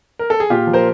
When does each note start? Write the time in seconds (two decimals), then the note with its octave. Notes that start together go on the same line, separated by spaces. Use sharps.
0.19 A#4
0.30 A4
0.40 G#4
0.50 A#2 F4 G4
0.67 F3
0.73 A#4 C5